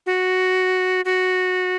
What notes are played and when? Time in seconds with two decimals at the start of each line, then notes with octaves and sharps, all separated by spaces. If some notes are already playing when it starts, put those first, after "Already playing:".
0.06 F#4
1.05 F#4